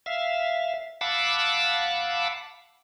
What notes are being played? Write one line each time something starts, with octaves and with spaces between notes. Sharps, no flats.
E5 F5
F5 F#5 A5 B5 D6 E6